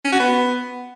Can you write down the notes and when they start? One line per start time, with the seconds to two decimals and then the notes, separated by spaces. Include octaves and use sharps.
0.05 C#4
0.12 F#4
0.20 B3